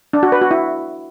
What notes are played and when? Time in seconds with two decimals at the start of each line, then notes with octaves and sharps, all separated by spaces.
0.13 D4
0.23 F#4
0.32 B4
0.41 F#4
0.51 E4